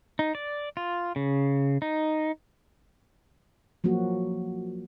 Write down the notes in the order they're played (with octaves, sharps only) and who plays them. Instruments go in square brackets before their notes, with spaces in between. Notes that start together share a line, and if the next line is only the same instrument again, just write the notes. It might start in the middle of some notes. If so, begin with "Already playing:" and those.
[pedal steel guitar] D#4
D5
F4
C#3
D#4
[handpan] F3 F#3 A#3 F#4